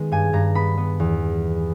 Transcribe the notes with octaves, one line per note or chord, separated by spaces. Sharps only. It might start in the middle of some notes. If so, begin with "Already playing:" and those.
Already playing: D#3 G#3 B3
G2 G#5
G2 A#5
B3 B5
B3
E2